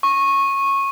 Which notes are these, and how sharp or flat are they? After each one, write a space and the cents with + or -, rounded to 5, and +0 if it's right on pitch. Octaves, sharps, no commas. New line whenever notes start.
C#6 -15